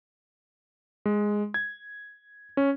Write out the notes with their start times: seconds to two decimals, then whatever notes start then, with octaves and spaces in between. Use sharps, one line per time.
1.06 G#3
1.54 G#6
2.57 C#4